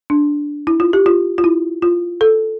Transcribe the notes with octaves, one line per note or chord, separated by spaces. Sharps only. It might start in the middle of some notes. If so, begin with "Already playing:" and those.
D4
E4
F4
G4
F4
F4
E4
F4
A4